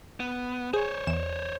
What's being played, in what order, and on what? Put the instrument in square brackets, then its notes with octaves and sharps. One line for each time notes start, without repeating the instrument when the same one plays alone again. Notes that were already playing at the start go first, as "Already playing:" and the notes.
[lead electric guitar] B3
[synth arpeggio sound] G#4 [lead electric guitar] C5 C#5
[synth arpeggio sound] E2 E7